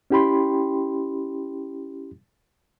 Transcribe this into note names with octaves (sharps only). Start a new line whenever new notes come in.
C#4 E4 G4 G5 B5 C6